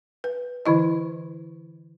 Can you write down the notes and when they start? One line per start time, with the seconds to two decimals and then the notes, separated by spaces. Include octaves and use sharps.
0.24 B4
0.66 D3 E3 E4 D#5